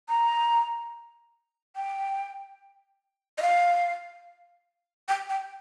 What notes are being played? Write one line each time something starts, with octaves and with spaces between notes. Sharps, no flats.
A#5
G5
D#5
F5
G5
G5